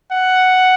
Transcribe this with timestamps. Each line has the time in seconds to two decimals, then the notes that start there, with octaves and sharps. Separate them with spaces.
0.12 F#5